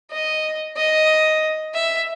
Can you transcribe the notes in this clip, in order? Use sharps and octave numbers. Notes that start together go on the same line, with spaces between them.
D#5
D#5
E5